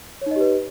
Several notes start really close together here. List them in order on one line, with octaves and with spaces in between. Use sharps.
C#5 D#4 D#5 G4 B4